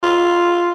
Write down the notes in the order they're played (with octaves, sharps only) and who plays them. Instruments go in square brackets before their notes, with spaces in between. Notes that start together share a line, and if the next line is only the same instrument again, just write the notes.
[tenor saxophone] F4